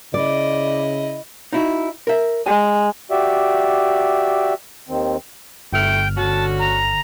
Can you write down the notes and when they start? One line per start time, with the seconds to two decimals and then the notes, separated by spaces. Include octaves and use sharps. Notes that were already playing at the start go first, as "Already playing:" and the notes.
0.14 C#3 E4 D5 D#5
1.53 D#4 E4 F#4
2.07 A#4 E5
2.46 G#3 G#5
3.11 F#4 G4 D5 E5
4.89 D#2 D#3 C4
5.73 G1 D2 A3 E4 G5 F6
6.17 D3 A3 C#4 F#4 A5
6.59 A#5